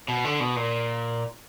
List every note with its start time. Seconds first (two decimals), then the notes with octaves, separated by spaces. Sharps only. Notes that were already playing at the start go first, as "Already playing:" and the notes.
0.08 B2
0.24 D3
0.40 B2
0.56 A#2